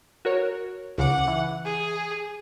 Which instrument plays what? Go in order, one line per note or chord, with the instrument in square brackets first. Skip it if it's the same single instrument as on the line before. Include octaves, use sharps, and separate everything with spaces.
[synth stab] F#4 A#4 C#5
[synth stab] C#2 C#3 D6 [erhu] F#5
[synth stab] E3
[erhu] G#4